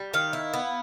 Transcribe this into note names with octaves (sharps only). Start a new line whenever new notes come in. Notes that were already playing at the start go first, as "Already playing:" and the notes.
Already playing: G3
D#3 F5
E4
B3